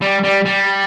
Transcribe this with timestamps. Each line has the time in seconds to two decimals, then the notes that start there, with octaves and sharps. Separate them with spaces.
0.01 G3
0.23 G3
0.45 G3